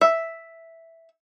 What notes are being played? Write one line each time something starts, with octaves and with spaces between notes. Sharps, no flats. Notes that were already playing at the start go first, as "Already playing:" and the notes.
E5